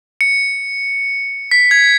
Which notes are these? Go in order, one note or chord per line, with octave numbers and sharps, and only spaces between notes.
C#7
B6
G#6